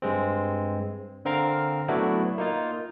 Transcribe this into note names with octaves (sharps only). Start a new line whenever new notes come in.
G2 G#3 C4
D3 C4 A#4 F5 A#5
F#3 A3 B3 D4 E4 F#4
A#3 D#4 F4